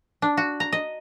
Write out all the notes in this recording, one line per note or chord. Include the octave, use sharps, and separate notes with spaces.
D4
F#4
A#5
D#5